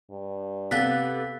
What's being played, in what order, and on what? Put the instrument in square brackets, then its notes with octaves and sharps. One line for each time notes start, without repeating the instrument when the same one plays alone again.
[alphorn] G2
[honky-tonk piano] C3 F#6 [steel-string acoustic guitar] B3 G4 A4 [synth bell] F5 A6 B6